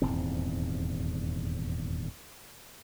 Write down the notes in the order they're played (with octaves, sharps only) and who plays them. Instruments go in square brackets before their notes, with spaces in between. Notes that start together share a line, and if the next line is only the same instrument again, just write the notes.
[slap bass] D#1 E2 G#2 C4